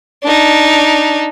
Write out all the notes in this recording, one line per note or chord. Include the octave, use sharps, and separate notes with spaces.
D4 D#4